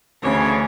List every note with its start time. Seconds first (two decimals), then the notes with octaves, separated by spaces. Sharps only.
0.22 D2 C#3 E3 C#5